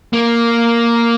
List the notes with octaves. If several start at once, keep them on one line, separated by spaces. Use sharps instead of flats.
A#3